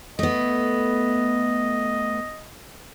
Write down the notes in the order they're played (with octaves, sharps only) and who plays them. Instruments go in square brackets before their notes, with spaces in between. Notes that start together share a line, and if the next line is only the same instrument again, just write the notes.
[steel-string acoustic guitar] A3 B3 [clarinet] D#5